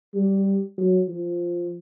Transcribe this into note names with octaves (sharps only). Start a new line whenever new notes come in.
G3
F#3
F3